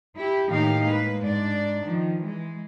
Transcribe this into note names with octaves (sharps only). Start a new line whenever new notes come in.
E4 G4
A2 D#3 A#3 D#4 G4 F5
G#3 A#3 B4
G#2 D4 D5
D#3 F3
E3 G#3